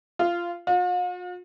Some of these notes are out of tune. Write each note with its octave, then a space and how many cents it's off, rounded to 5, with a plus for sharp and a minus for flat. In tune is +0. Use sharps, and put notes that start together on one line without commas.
F4 -15
F4 +45